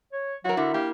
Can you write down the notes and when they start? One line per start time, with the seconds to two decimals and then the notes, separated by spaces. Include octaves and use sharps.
0.13 C#5
0.45 F#3 E4 F#4 A#4
0.57 D3 E4 A#4 E5
0.74 A#3 G4